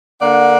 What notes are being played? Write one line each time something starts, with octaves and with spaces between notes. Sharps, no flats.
D3 A#3 D4 D5 F#5